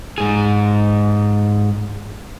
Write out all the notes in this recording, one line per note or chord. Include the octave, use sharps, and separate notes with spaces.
G#2 G#4